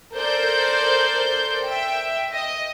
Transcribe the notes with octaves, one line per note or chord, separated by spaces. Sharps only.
A4 A#4 C5 D5 G6
E5 G5
D#5